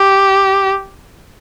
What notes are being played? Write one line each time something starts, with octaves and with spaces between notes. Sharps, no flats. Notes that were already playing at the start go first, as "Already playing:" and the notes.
Already playing: G4